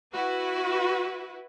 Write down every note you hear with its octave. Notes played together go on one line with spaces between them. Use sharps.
E4 F#4 B4